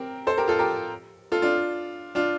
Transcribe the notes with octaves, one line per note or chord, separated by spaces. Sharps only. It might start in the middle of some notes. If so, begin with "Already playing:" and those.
Already playing: C4 G4 A#4
A4 C5
G4 A#4
F4 A4
G4 A#4
F4 A4
D4 F4
D4 F4